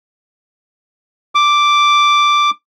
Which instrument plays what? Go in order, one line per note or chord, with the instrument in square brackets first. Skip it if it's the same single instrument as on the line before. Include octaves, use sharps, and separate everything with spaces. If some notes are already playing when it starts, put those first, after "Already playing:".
[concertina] D6